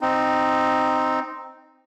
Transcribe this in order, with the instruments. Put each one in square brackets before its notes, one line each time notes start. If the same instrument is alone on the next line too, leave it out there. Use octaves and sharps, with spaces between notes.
[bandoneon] C4 D#4